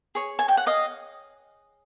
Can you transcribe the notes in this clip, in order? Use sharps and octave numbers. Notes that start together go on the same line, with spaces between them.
G#4 C#5
G#5
G5
F#5
D#5 F5